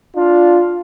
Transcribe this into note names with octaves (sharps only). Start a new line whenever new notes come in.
D4 F4